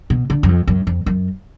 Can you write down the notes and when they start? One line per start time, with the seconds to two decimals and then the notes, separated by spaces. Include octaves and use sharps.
0.10 B2
0.30 D3
0.43 F#2
0.49 F2
0.67 F#2
0.87 F2
1.06 F#2